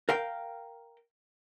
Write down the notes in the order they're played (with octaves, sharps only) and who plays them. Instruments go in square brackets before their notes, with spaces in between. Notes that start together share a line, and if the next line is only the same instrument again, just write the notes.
[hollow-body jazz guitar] A#4 F5 G5